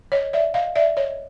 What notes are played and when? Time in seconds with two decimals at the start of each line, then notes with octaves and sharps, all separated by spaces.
0.12 C#5 D#5
0.33 D5 E5
0.54 D#5 F5
0.76 D5 E5
0.97 C#5 D#5